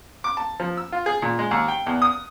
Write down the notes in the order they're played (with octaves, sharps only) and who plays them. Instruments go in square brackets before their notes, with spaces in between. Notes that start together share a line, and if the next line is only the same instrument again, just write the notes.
[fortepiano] D6
A5
F3
E6
F4
G#4
A#2
G#3
D#2
G5
E2
D#6